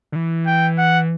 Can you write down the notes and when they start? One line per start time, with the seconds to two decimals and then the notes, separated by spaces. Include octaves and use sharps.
0.12 D3
0.16 E3
0.47 G5
0.78 F#5